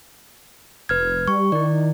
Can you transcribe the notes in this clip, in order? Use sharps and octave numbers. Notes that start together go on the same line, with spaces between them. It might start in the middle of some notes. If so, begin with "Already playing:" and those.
F1 B4 F6 G#6
G3 C#6
D#3 E4 D5